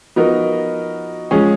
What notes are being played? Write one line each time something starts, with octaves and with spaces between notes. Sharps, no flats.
F3 B3 D#4 F#4 A#4
F3 G#3 C#4 G#4